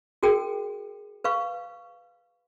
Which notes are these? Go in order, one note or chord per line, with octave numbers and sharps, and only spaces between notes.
F#4 G#4 A#4 G5
B4 F5 C#6